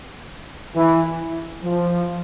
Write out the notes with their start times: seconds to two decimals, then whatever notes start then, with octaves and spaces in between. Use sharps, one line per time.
0.75 E3
1.63 F3